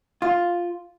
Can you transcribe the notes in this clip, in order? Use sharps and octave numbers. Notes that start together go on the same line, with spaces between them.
F4